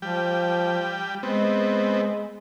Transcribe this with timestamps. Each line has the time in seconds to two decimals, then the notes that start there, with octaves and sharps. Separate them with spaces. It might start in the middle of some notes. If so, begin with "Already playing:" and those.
0.02 F3 G3 G5
1.23 G#3 B3 C4